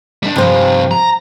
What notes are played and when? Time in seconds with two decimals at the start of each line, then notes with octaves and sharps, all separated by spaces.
0.23 G3 D4
0.36 G2 C3 F3 C5
0.91 A#5